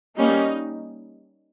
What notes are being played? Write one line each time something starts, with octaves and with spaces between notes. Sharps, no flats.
G3 A#3 C#4 D#4